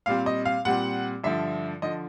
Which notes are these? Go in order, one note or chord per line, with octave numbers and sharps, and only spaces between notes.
A#2 G3 C4 F5
D#5
F5
A#2 G3 C4 F#5
G2 D3 F3 E5
D3 F3 D#5